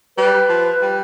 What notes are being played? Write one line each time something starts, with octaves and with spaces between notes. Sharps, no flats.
G3 B4
F3
G3